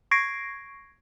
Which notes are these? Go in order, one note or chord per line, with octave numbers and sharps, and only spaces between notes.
C#6 G#6 A#6 C7 D7